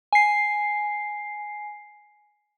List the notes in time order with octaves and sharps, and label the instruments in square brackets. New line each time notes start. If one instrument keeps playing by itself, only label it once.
[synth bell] G#5 C7